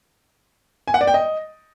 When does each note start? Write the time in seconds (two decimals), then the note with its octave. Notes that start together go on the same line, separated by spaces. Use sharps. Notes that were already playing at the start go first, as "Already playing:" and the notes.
0.88 G#5
0.94 F#5
1.01 D5
1.07 G5
1.14 D#5